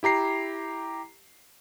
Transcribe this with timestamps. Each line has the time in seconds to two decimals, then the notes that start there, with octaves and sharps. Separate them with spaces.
0.03 E4 G4 A#5 C7